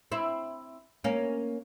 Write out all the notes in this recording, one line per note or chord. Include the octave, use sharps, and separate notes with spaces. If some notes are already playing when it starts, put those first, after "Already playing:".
C4 E4
A#3 C#4